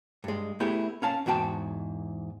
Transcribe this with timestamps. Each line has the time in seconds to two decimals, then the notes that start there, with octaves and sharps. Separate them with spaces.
0.24 G2 G#3
0.60 A3 B3 E4 G4 G#4
1.02 C#4 F5 A5
1.26 E2 G#2 F#4 G5 A5